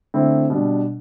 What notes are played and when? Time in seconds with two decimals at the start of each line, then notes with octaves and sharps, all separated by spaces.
0.14 D3 A3 C4 E4
0.50 B2 G3 D4